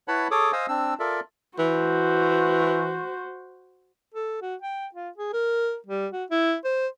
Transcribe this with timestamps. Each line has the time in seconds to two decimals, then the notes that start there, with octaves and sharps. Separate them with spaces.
0.08 E4 B4 C#5 F#5 A5 B5
0.31 G#4 A4 C#5 D6 D#6
0.53 C5 D#5 F5 G#5 D#6 E6
0.68 C4 D4 E6
0.99 F4 A4 A#4 D5 E5
1.59 E3 F#4 C5
4.14 A4
4.42 F#4
4.62 G5
4.95 F4
5.17 G#4
5.33 A#4
5.87 G3
6.13 F#4
6.31 E4
6.65 C5